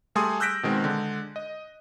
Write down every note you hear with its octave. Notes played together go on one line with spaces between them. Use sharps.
G3 A3 G#4 G#5 C6 D#6
E6 F#6 G6 A#6 B6 D7
B2 D#3 G#3 C4
D3 G#3
D#5